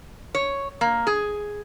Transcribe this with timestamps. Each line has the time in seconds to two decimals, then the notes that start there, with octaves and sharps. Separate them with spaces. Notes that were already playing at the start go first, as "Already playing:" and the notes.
0.35 C#5
0.81 A#3
1.07 G#4